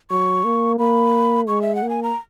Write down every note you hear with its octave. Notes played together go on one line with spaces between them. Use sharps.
F#3 C#6
A#3
A#3 B5
G#3 C#6
E5
F#5
A#3
G#5
A#5